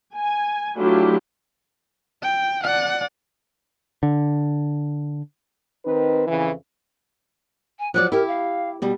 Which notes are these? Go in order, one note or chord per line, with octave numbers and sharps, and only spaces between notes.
G#5
F#3 A3 D4 E4 F4 G4
G5
D5 F#5
D3
D#3 C4 D#4 B4
F2 C#3 E3
G#5
F3 F#3 D5 F#6
E4 G4 A#4
F5
B2 G3